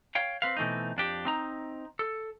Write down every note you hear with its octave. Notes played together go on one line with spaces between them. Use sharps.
C#5 F5 G5
C4 B4 F5
B2 E3 A3 C4 D#4
F2 D4 G4
C4 D#4 A#5
A4